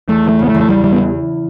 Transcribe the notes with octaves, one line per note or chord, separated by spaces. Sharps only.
E2 A3
E3 A3
C#3 B3
A3
E2
A3
E2 G3
E3 G3
B3